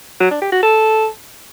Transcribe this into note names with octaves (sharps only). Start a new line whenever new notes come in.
F#3
D4
G4
F#4
A4